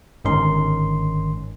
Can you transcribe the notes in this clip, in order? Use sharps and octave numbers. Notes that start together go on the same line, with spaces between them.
G1 G#2 D#3 C#4 D#4 C6